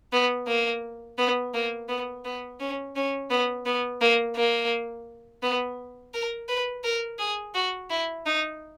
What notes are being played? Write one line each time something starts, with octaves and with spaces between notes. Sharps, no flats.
B3
A#3
B3
A#3
B3
B3
C#4
C#4
B3
B3
A#3
A#3
B3
A#4
B4
A#4
G#4
F#4
E4
D#4